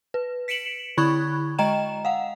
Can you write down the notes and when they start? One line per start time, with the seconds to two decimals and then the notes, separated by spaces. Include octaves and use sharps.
0.14 B4
0.48 B6 C#7 D7 E7 F#7
0.97 D3 E4 B5 C#6 F#6 G#6
1.58 G#3 D#5 G5 A#5 E7
2.05 F5 F#5